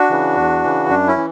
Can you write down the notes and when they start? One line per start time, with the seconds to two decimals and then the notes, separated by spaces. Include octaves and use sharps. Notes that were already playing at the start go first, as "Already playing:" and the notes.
Already playing: D4 F#4
0.10 C#3 E3
0.37 E2
0.63 C#3 E3
0.89 F#2 D4
1.07 C#4 E4
1.16 E3